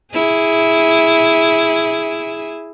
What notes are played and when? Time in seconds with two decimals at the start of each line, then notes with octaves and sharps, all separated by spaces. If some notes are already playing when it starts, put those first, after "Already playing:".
0.13 E4 G#4